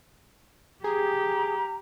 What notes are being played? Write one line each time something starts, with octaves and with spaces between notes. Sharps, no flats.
G4 G#4 A#5